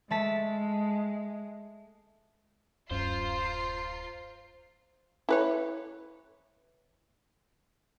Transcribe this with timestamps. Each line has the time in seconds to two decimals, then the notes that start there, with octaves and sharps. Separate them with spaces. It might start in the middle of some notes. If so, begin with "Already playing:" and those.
0.10 G#3 A3 A5 B6
2.91 D1 F#2 C#4 F4 C5 A#5 C7
5.29 E4 B4 C#5